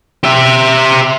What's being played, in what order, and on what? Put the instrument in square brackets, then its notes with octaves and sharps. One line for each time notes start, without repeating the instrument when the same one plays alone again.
[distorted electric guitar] G4 E5